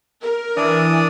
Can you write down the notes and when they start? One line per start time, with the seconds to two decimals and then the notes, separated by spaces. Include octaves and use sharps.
0.22 A#4
0.57 E3 D4 D5 D#6